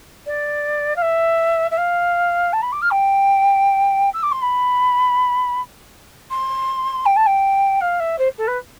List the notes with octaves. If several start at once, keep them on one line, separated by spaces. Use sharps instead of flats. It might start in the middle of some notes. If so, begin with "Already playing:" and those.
D5
F5
E5
E5
F5
A5
B5
D6
F6
G5
E6
D6
C6
B5
C6
G5
A5
G5
F5
E5
C5
A4
B4